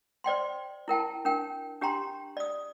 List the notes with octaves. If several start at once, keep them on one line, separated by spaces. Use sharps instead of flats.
C5 D5 G5 C6
E4 A#4 G5 A5
D4 A#4 G5
D4 G4 G5 A#5 C6
D5 D#6